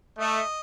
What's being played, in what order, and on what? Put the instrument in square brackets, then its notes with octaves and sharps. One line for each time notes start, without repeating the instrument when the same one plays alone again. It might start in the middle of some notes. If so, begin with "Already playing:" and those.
[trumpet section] A3 [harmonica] D#5